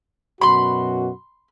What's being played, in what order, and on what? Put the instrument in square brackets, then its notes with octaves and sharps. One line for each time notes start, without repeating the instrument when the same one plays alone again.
[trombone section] F#2 B2 F#4 [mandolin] B5 C6